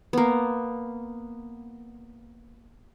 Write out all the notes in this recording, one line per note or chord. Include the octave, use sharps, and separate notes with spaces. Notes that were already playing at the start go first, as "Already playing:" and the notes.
A#3 B3